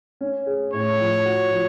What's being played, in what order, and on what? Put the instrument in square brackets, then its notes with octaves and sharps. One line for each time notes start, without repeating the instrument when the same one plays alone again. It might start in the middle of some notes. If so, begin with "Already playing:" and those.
[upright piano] C#4
G#4
[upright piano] A2 [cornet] C#5
[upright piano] F3
F#4
F3